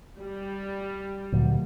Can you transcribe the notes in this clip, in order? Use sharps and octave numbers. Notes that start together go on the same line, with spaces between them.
G3
D2 A#2 F#3